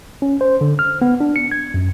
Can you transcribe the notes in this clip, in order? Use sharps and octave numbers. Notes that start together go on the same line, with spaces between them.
C#4
C5
D3
F6
B3
D4
C#7
G#6
F#2